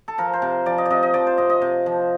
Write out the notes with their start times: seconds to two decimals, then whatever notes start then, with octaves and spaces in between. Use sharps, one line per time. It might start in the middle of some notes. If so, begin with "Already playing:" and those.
0.08 A4
0.18 F3 A#4
0.33 C5
0.42 C3
0.66 F3 D5
0.78 D#5
0.85 D5
0.90 C3 D#5
1.03 D#5
1.14 F3 D5
1.27 C5
1.38 C3 D#5
1.50 D#5
1.62 C3
1.86 F3